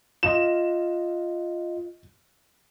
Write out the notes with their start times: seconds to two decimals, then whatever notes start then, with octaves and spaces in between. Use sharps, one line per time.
0.23 F4 D#5 E7